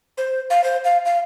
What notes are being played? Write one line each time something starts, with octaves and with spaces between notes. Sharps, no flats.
C5
F5
C5
F5
F5